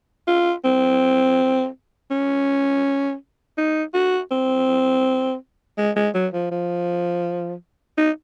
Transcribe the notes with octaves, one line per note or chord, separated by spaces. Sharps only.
F4
C4
C#4
D#4
F#4
C4
G#3
G#3
F#3
F3
F3
D#4